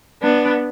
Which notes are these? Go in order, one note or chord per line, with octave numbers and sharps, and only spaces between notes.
B3 D4